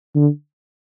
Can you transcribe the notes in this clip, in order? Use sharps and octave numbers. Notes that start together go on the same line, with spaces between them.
D3